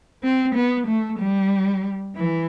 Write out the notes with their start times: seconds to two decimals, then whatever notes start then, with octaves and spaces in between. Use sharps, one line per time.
0.23 C4
0.55 B3
0.87 A3
1.19 G3
2.16 E3